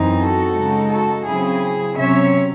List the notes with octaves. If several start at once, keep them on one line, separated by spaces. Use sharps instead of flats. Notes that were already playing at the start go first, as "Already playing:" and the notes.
Already playing: F#2 E3 C4 D#4
F#4 A4
C#3 G#3 D#4
F#4 A4
C#3 F#3 C4 E4 G#4
C3 F#3 C#4 C#5 E5